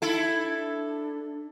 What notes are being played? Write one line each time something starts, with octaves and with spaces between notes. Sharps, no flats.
D#4 E4 A4
D4